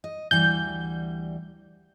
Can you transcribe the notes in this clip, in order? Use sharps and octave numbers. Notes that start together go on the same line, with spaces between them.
D#5
D2 E3 G3 G6